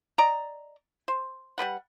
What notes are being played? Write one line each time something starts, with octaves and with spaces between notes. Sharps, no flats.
D5 D#5 A#5
C5
G3 B3 B4 F#5